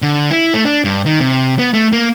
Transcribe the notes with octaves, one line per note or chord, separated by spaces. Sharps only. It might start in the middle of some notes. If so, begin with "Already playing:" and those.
D3
E4
A3
D4
G2
D#3
C3
B3
A3
A#3